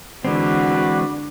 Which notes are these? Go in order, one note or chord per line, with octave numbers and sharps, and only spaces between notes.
D3 E3 G#3 C4 F#4 B4 D5